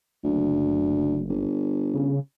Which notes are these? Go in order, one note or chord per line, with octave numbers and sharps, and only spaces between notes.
F#1 D2
G1
C#3